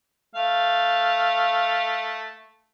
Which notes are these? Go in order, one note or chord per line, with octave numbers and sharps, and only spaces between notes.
A3 F5